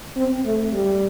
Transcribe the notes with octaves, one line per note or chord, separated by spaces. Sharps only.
C4
A3
G3